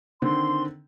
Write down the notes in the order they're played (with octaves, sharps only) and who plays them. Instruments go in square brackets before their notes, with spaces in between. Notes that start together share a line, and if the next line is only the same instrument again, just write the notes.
[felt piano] D3 D#3 C4 [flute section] C6